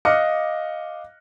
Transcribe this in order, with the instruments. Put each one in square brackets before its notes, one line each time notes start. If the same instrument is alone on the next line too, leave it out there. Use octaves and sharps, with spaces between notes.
[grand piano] D#5 F5 D6 F6 F#6 C#7